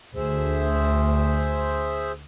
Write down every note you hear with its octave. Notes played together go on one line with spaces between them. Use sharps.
D2 G#4 C5 E5